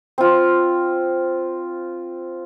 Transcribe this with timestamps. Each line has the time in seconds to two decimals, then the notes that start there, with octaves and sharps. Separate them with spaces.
0.18 C4 F4